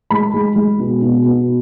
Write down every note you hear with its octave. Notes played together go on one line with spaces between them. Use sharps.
G#3 B5
G#3
G#3
B2
B2
B2